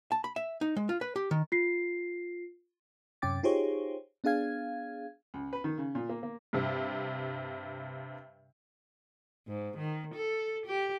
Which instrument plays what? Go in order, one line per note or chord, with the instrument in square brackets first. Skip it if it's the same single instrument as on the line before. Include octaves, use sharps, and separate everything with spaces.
[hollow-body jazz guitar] A5
B5
E5
D#4
G#3
F4
B4
G4
D#3
[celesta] F4 C7
[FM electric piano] F#2 C3 C#4 G5 D6 A6
D#4 F4 G4 G#4 C5 C#5
B3 D4 G#4 F5 G#6
[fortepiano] C#2
B4
D#3
C#3
A#2
A#3
A#3
[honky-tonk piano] G2 C3
[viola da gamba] G#2
D#3
A4
G4